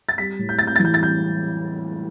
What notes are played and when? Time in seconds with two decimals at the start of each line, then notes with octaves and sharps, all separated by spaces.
0.09 A6
0.18 G3 B6
0.39 A2
0.49 G6
0.59 A2 A6
0.67 G6
0.76 A6
0.80 E3
0.85 G6
0.94 A6
1.00 G3 G6